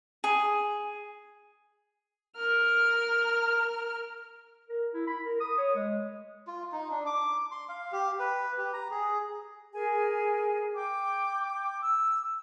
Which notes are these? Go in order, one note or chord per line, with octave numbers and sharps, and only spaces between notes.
G#4
A#4 F6
A#4
E4
B5
A#4
D#6
C#5
G#3
F4
D#4
D4
D6
C6
F5
G4
B4
G4
A#5
G#4
G#4 A#4 G#5
G5 D6
E6